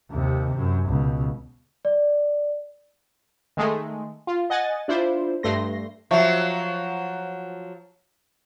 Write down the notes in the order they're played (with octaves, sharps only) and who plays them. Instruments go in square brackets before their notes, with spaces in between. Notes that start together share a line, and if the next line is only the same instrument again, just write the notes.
[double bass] D#2 C3
F#2
C#2 B2
[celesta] D5
[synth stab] D#3 G#3 A3
F4
D#5 F#5 G#5 A6
D4 E4 F4 C5
G2 A3 C6 A#6
[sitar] F3 F#3 [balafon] E5 C#6